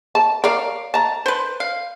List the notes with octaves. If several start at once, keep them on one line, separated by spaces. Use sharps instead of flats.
A5
A#4 C#5 D5 F5
A5 A#5
B4 C5
F5